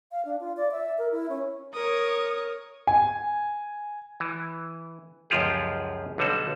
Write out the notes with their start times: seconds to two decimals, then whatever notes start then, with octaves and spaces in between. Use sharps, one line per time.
0.12 F5
0.25 D4
0.40 F4
0.57 D5
0.72 E5
0.98 A#4
1.11 E4
1.30 C#4
1.73 A#4 C#5 D#6
2.87 G#5
4.20 E3
5.30 C#2 F#2 F3 F4 G4 G#4
6.18 B1 D3 G3 F#4 A4